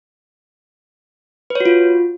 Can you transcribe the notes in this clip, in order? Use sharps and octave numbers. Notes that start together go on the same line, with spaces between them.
B4
C#5
F#4
F4